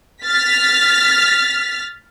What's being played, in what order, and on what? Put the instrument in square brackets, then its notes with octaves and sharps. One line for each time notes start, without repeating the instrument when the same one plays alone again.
[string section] F6 A6 B6